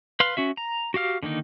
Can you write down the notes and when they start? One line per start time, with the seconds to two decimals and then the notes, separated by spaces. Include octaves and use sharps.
0.20 B4 F5 C6 F6
0.37 C#4 F#4 E5
0.57 A#5
0.94 F#4 G4 F5 F6
1.23 D3 D#3 A#3 D#4